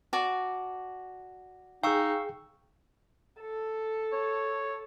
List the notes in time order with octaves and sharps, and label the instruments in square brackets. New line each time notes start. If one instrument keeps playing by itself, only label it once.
[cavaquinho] F#4 D5 A5
[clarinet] D#4 [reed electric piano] G#4 G5 [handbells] F5 C#6 E6
[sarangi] A4
[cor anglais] C#5